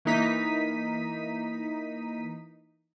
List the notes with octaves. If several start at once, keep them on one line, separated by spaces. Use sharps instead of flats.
E3 A#3 D#4 B6 D#7